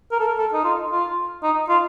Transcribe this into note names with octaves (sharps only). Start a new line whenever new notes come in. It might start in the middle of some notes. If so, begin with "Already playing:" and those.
A#4
A4
A#4
A4
D#4
F4
F4
D#4
F4